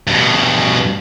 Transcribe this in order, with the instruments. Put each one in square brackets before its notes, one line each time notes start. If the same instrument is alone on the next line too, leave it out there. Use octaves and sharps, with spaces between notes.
[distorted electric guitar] G2 B2